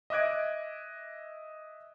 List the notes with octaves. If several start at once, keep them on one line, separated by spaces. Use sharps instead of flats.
D#5 E5 D6 F#6 G#6 D7